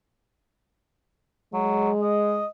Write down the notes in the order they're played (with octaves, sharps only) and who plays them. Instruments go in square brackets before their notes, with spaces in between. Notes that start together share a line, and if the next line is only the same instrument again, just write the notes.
[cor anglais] F#3 [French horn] G#3
[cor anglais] D#5